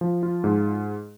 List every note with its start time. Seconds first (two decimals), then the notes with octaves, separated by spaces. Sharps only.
0.01 F3
0.23 F4
0.44 G#2